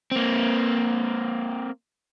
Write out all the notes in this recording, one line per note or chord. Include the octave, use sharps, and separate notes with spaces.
A#3 C4